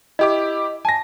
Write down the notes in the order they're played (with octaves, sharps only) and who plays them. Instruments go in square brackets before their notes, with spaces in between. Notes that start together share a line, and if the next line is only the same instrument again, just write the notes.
[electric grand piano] E4 G4 D6 [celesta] D#5
[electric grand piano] G#5 A#6 [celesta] A5